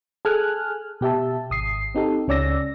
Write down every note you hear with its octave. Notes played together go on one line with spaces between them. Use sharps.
G#4 A4 G#5 F6 F#6
B2 G4 E5 A5
G#1 D#6 C7
C4 D#4 G4 A4
C#2 C#4 D5 E6 A#6